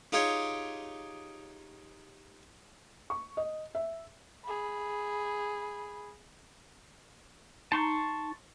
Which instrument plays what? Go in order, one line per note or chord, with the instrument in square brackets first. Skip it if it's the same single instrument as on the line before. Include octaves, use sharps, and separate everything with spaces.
[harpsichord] D#4 F4 G4 G#4 C#5
[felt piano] C#6
D#5
E5
[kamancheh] G#4 B5
[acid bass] D#4 [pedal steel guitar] A5 C6 C#6